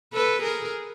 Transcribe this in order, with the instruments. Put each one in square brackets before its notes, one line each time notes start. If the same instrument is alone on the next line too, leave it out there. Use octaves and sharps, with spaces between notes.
[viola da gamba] A4 B4
G#4 A#4